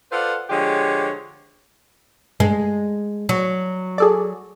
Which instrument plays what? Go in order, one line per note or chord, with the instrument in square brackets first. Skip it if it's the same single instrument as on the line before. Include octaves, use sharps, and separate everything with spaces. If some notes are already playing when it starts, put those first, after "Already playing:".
[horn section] F4 A4 B4 C5 D5 F#5
D3 F3 G#3 G4 C#5
[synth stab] G2 [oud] G#3
[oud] F#3
[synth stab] G#4 A4 D5